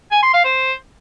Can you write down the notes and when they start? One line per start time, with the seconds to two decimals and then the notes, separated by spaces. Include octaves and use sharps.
0.12 G#5
0.23 C6
0.34 F5
0.45 C5